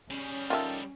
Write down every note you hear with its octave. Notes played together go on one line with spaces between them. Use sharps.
G3 C#4 G#4
D#3 F4 G4 A4 E5